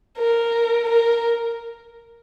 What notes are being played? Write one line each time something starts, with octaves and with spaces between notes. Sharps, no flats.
A#4
A#4